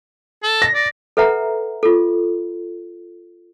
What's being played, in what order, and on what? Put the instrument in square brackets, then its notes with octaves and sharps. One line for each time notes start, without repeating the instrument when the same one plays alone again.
[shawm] A4
[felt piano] A#6
[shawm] D5
[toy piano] A4 B4 E5 F#5 A#5
F4 A4